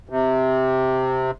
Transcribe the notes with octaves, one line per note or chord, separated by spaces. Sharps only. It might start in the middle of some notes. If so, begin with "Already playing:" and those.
C3